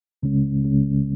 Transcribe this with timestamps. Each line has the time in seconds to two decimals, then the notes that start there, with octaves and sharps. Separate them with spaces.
0.23 C#2 C#3 G#3 C#4
0.64 C#2 C#3 G#3 C#4